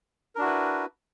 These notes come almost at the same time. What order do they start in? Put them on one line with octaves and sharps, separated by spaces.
A#4 D4 F#4 E4 B4